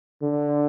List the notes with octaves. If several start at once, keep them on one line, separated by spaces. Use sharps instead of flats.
D3